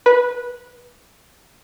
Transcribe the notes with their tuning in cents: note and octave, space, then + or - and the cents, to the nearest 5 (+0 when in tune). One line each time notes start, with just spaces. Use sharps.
B4 -15